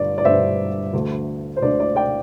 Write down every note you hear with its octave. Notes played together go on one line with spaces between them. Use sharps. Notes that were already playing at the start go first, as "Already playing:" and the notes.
Already playing: G1 G2 G3 D5
D5
G1 G2 G3 D4 C5 E5
D2 D3 A3
C5
D2 D3 A3 D5
D5
D5 G5